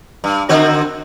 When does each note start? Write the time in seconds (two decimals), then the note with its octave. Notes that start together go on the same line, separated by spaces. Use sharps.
0.24 G2
0.49 D3 C4 F#4